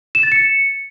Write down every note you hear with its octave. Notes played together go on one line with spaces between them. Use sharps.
E7
A6
C#7